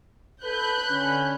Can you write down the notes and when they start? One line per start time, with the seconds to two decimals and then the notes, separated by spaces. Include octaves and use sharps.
0.44 A4 B4 B5 F#6 G6
0.90 D3 C#4